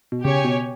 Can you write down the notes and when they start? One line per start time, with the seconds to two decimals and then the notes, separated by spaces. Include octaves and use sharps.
0.12 B2
0.24 C#3 G4 C#5 G#5
0.45 B2